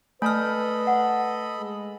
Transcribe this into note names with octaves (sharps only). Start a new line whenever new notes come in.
A3 A4 B4 D#5 G#5 A5 B5 F6
F#5
G#3